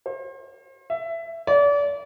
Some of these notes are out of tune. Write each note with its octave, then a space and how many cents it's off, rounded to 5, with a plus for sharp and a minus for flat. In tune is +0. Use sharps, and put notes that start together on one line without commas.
C5 +40
E5 +15
D5 -35